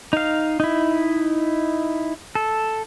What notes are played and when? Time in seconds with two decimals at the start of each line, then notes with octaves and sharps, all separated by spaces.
0.13 D#4 F5
0.60 D#4 E4
2.35 A4